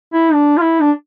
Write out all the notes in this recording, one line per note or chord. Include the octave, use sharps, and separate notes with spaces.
E4
D4
F4
E4
D4